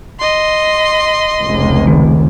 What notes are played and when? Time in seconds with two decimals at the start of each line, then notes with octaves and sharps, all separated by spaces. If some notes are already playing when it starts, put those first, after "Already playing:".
0.20 D#5 C6
1.41 F1 C#2
1.87 D#3